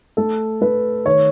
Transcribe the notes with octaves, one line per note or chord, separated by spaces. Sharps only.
A3 A4
A3 B4
D#3 C#5